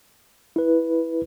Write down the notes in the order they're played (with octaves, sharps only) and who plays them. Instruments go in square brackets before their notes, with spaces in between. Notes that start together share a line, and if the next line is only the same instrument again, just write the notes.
[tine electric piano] E4 B4